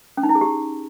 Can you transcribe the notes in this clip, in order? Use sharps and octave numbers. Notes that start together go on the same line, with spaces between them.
C#4
D#4
E4
G#4
G4